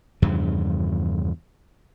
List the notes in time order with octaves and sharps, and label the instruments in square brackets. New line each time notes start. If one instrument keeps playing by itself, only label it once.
[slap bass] E2 G2 C#3 F3